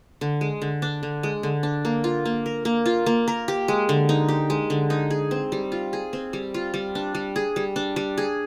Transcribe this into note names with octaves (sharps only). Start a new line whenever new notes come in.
D3
G#3
D3
D4
D3
G#3
D3
D4
A#3
F4
A#3
A#4
A#3
F4
A#3
A#4
G4
G#3
D3
D#4
G4
G#3
D3
D#4
G#4
C4
G3
F4
G#4
C4
G3
F4
G3
D4
G3
G#4
G3
D4
G3
G#4